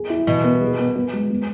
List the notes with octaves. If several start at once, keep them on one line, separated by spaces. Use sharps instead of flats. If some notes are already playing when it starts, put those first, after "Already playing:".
Already playing: G#4
E4
B2 E3
B3
G#4
B3
B3
G#3
B3